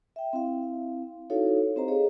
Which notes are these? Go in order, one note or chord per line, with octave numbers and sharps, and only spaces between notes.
E5 G5
C4 E4 F5
D#4 E4 F#4 A4 C#5 F5
C4 G4 C5 D#5 A#5
G#4 A4 C#5 D#5 F5